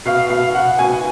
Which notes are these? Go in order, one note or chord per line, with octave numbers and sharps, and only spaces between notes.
B2 F5
B2 F5
B2 F#5
B2 G#5